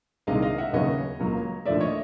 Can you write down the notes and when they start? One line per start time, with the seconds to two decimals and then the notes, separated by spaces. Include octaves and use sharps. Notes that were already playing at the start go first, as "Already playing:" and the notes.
0.27 C2 C3 D#3 G#3 D#5 F5
0.42 D#5 F5
0.58 E5 F#5
0.73 D#2 C#3 F#3 B3 C#5 D#5
1.19 C#2 C#3 F#3 A#3
1.65 D#2 D3 F3 A3 D5 E5
1.81 C#5 D#5